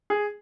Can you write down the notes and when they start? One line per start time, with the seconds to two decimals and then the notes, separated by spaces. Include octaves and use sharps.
0.10 G#4